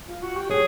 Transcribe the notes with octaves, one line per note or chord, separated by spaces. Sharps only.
F4
F#4
G4
F#3 G#4